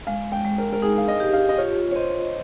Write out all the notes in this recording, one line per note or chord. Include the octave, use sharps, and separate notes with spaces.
G#3 F5
G5
G#3
A#4
A#4
D#4 G#4
F5
D#5
G4
F5
D#5
F4 C#5
C#5
C5 D#5